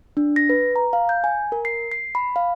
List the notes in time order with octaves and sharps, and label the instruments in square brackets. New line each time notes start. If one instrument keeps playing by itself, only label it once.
[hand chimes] D4
A#6
B4
A#5
F5
G6
G#5
A#4
C7
C7
B5
F5